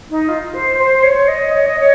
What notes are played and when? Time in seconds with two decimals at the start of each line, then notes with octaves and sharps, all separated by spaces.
0.10 D#4
0.29 F4
0.54 C5
0.78 C5
1.03 C#5
1.28 D#5
1.54 C#5
1.66 D#5
1.80 C#5